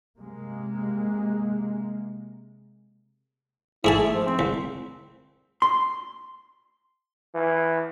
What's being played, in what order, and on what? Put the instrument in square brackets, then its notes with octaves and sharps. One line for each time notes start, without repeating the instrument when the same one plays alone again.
[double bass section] C3 G#3 A#3
[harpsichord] G#2 G#4 A5 [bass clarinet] E4
[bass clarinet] A3
F3
C4
[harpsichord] C2
[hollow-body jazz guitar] C6
[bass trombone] E3